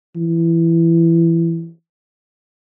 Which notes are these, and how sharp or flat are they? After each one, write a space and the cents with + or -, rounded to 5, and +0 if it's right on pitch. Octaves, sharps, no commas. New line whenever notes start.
E3 +15